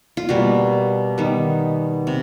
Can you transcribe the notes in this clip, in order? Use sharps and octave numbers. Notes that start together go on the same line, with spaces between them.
F4
B2 G3 A#3 F#4
D#3 G3 B3
C3